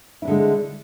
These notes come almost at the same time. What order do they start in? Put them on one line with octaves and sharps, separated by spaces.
E4 D4 D3 G#3